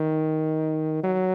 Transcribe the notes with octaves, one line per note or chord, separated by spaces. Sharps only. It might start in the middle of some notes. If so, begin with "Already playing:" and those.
Already playing: D#3
F#3